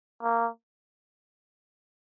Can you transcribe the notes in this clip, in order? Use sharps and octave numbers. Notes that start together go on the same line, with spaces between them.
A#3